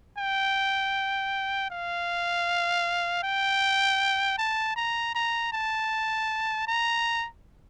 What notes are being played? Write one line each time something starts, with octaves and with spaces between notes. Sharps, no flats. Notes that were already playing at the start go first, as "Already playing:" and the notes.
G5
F5
G5
A5
A#5
A#5
A5
A#5